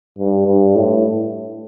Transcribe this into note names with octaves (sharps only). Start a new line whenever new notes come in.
G2
G2
A2